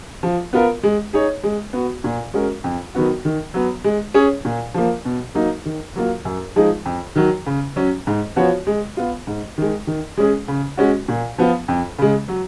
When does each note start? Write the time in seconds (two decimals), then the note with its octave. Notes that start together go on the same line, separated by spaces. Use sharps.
0.23 F3
0.53 B3 F4 A#4
0.83 G#3
1.13 D#4 G#4 C#5
1.43 G#3
1.73 B3 F#4
2.04 A#2
2.34 G#3 C#4 F#4 A#4
2.64 F2
2.95 D#3 F#3 B3 F#4
3.25 D#3
3.54 F#3 B3
3.84 G#3
4.14 C#4 G#4 C#5
4.45 A#2
4.74 F3 A#3
5.05 B2
5.35 F#3 A#3 D#4
5.65 D#3
5.96 F#3 A#3 F4
6.25 F#2
6.56 F3 G#3 D#4 G#4
6.86 F2
7.16 D#3 F#3
7.46 C#3
7.76 F#3 C#4
8.07 G#2
8.36 F3 B3 F#4 C#5
8.67 G#3
8.97 B3 F4
9.27 G#2
9.58 D#3 G#3
9.87 D#3
10.17 G#3 C#4 G#4
10.48 C#3
10.77 G#3 C#4 F#4
11.08 A#2
11.38 F3 B3 F4
11.68 F2
11.98 C#3 G#3
12.28 F#3